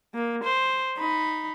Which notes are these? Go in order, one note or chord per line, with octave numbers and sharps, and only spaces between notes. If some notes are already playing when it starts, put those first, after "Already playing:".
A#3
C5
D#4 B5